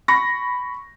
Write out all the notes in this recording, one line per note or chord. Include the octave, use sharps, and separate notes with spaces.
B5 C#6 A#6